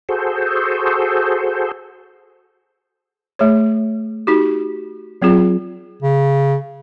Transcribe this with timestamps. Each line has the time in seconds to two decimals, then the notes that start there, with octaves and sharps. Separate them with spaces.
0.09 F#4 G#4 A4 C5
3.39 A3 G#4 C#5
4.27 D#4 F#4 G4
5.22 F#3 C4 F4 G#4
6.02 C#3